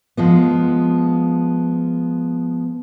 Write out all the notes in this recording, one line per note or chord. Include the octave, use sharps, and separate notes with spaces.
F3 G#3 B3